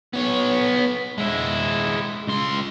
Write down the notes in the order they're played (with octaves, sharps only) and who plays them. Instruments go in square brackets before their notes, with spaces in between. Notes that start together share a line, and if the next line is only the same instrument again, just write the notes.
[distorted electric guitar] B3 C#5
G#3 E4
C#2 C6